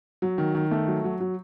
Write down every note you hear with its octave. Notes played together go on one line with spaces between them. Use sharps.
F#3
D#3
D#3
A3
F#3
F#3
F#3